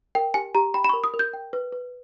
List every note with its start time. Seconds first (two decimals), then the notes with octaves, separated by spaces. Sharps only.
0.15 A#4 G5
0.34 G4 G#5
0.55 G4 A#5
0.74 G5 B5
0.84 B5
0.89 A#4 C#6
1.04 D#6
1.14 A#4
1.19 G6
1.33 G5
1.53 B4
1.73 B4